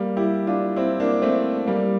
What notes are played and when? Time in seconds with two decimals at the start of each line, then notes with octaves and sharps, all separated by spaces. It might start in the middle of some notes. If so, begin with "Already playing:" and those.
Already playing: G3 A#3
0.17 E4 G4
0.47 D4 F4
0.76 C4 E4
1.00 A#3 D4
1.22 A3 C4
1.66 G3 A#3